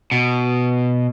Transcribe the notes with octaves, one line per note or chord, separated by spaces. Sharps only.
B2